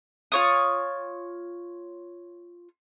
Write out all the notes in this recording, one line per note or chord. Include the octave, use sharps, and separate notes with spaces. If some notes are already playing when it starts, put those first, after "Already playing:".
F4 C#5 D#6